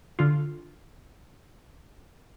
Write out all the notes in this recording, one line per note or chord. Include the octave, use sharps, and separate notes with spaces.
D3 F4